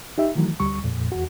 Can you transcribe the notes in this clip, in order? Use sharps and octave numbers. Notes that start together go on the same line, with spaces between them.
D#4 G4 E5
D#3 E3 F#3 A3
D2 G3 C#6
F2 A#2
E2 F#4